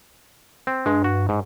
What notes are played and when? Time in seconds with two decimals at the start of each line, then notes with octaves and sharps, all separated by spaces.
0.67 C4
0.86 G2 G#3
1.04 F#4
1.29 G#2